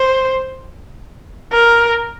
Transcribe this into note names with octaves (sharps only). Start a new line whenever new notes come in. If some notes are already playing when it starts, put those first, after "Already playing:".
Already playing: C5
A#4